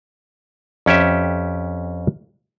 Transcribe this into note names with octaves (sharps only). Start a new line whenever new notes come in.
F2 C#4 G4 E5